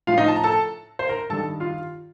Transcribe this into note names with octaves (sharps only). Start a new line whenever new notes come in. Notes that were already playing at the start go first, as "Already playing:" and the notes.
A2 F3 F4 F5
D#4 D#5
A5
A#5
A4 A5
C5 C6
A#4 A#5
G2 D#3 G3 A4 A5
F4 F5